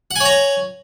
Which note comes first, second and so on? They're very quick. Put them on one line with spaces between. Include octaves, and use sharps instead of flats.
F#5 G#5 C#5 A#5